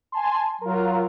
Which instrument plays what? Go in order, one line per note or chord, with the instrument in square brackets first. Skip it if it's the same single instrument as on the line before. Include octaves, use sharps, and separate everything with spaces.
[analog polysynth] G#5 A5 C6
[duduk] F#3 [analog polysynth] F4 A#4